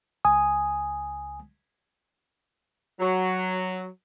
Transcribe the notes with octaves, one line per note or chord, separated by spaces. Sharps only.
C#2 G#5 D#6
F#3